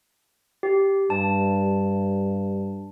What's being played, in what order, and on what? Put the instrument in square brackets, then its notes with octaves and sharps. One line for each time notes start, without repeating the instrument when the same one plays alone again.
[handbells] G4
[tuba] G2 [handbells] A5